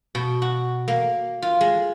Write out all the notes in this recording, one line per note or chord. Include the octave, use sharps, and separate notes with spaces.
B2
F#4
A#3
F4
G#3